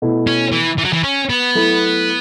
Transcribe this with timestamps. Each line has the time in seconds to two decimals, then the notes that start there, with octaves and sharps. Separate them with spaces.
0.02 B2 A3 E4
0.27 C#4
0.52 E3
0.78 E3
0.85 F#3
0.93 E3
1.04 C#4
1.30 B3
1.55 F#3 A3 E4 A4